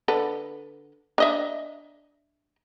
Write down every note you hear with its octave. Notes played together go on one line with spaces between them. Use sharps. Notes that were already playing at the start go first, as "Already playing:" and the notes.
D3 A4 B4
D4 D#5 E5